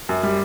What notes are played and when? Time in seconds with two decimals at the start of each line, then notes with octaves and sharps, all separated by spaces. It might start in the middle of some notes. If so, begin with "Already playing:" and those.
0.09 F#2
0.23 G3